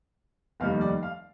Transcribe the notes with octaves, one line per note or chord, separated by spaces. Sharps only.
F1 D#2 D#3 G3 F5
D5
F5